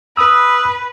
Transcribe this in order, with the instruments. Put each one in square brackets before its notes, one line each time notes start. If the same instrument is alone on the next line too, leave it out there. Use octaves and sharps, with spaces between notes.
[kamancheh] B4 [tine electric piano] D#6 E6